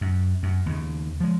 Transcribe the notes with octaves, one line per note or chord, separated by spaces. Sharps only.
F#2
F#2
D#2 C#3
F3 G#3